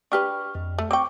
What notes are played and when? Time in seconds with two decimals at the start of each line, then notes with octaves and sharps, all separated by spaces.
0.12 D4 G4 B4 C#6 F6
0.55 F2
0.79 A3
0.91 C4 G5 C#6 D6